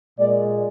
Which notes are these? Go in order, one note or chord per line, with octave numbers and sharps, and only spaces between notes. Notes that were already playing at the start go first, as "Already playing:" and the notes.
A#2 G#3 D5